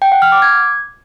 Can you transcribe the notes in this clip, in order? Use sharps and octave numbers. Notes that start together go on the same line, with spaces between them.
G5
F#5
F6
D6
G#6